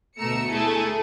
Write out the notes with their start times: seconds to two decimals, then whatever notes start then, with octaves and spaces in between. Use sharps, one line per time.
0.18 D2 B2 A3 A#5 E6 C#7
0.49 A3 E4 G#4 A4